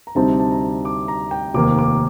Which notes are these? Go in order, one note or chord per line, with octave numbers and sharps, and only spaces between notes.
A#5
D2 C3 G3 C4 D#4 A5
A5
A#5
D6
A#5
G5
F1 D#2 D#3 A#3 D6
D6